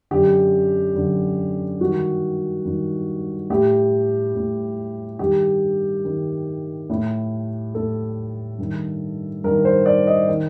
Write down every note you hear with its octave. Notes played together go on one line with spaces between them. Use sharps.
F#2 D3 G4
F#2 D3
G2 D#3 F#4
G2 D#3
A2 G4
A2
G2 D#3 G4
G2 D#3
A2
A2 A4
G2 D#3
G2 D#3 A#4
C5
D5
D#5
D#3